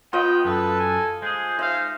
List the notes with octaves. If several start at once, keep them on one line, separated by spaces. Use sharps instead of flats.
B3 F4 D#5 G5
F#2 A4 B4
G#5
G#3 G#4 C5
D#4 C5 E5 F5